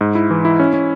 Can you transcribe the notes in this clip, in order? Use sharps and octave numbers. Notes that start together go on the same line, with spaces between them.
G#2
E4
E3
E4
C#4
C#4